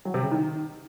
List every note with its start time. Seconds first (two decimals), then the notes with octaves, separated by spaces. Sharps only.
0.05 F#3
0.14 C3
0.23 C#3
0.32 D#3